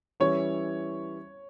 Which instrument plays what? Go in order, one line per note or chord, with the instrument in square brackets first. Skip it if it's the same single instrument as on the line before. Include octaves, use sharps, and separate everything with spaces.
[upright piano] E3 G3 C#4 E4 [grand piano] C#5